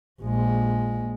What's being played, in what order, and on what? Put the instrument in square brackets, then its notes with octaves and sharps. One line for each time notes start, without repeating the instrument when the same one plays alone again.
[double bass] A#1 G#3